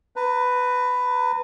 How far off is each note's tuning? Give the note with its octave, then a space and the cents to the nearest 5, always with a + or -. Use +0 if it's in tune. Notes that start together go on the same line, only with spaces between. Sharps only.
B4 +10 A#5 -25